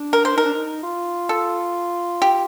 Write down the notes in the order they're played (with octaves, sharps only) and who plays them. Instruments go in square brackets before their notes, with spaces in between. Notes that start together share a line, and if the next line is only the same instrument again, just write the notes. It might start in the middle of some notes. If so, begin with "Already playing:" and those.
Already playing: [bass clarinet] D4
[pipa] A#4
C5
[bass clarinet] D#4 [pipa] A#4
[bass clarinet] D4
D#4
F4
[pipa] A4
G4